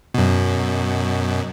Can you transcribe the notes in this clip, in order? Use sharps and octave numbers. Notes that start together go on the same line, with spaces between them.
F#2 B2